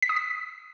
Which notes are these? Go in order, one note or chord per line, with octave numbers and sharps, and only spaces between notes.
B6
D#6
B6